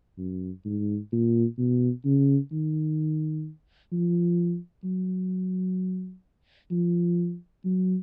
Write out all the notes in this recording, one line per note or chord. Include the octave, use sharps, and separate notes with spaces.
F#2
G#2
A#2
B2
C#3
D#3
F3
F#3
F3
F#3